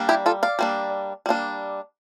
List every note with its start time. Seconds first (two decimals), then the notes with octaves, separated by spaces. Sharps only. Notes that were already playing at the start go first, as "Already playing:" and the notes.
Already playing: G3 A#3 D4
0.09 E4 G4
0.26 F4 A4
0.43 D5 F5
0.59 G3 A#3 D4
1.26 G3 A#3 D4